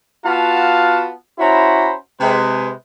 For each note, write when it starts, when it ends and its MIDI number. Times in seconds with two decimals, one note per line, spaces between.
0.25 1.11 59
0.25 1.11 65
0.25 1.11 66
0.25 1.11 77
0.25 1.11 81
1.39 1.94 61
1.39 1.94 64
1.39 1.94 66
1.39 1.94 72
1.39 1.94 82
1.39 1.94 83
2.20 2.72 48
2.20 2.72 56
2.20 2.72 71